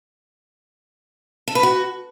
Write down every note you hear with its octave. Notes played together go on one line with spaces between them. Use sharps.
A4
B4
F#4